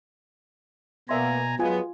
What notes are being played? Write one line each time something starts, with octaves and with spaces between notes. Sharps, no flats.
B2 A#3 B3 D5 E5 G#5 A#5 C6
F#3 G#3 B3 F4 G#5